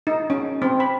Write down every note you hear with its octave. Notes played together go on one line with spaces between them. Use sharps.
D#4
C#4
C4
B5